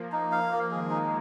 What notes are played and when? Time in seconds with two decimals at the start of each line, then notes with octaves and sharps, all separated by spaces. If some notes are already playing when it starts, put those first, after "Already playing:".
Already playing: F3 A#3
0.12 D#4
0.32 F5
0.52 A#3
0.71 D#3 G#3 G#4
0.90 D#4